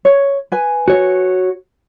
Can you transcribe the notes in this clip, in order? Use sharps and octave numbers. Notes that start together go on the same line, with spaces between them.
C#5
B4 G#5
F#4 C#5